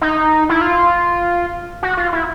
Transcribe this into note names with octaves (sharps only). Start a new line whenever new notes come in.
D#4
E4
F4
F#4
F4
E4